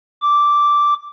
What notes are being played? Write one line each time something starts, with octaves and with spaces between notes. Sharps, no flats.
D6